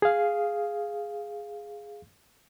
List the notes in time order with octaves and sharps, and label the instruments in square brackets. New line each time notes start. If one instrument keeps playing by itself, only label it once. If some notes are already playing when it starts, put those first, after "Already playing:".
[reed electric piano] G#4 F5